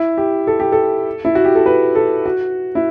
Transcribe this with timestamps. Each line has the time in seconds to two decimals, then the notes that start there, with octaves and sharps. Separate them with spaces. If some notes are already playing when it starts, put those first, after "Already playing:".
Already playing: E4
0.18 G4
0.47 A4
0.60 G4
0.72 A4
1.25 E4
1.35 F#4
1.45 G4
1.55 A4
1.66 B4
1.95 A4
2.25 F#4
2.75 E4